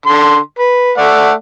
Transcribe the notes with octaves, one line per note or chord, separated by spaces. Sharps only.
D3 C6
B4
A3 D5 F#5